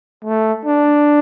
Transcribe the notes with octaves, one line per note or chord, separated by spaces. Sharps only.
A3
D4